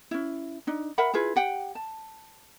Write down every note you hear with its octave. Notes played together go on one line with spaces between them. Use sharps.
C#4 E4
D4 D#4
A#4 E5 F#5 B5
E4 F4 G#4 B4
G4 F#5 G5
A5